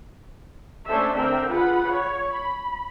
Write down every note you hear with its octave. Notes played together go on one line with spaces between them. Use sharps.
A3 C#4 D4 A4 C5 E5
D3 C4 A#4 E5 G5
F4 G#4 B4 F#5 B5
C#5
B5